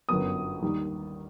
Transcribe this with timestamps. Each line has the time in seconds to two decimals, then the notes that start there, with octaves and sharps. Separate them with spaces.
0.09 G1 F#2 F#3 B3 D#6
0.62 D#2 D#3 G3